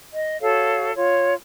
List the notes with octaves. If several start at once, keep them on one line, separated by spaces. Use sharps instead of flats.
D#5
F#4 A4 C#5 F5
F4 C#5